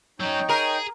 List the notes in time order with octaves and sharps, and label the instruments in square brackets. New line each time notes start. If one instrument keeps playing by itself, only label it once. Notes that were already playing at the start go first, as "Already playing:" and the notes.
[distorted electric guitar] F#3 C#4 [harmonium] D#4 C#5 G5
[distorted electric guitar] G#4 [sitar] A#4